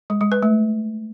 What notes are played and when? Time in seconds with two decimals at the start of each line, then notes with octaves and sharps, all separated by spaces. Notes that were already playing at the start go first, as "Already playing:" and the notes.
0.10 G#3
0.21 G#3
0.32 B4
0.42 A3